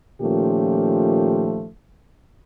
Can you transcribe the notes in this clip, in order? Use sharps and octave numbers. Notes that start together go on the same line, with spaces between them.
A#2 D#3 F3 A3 C#4 G4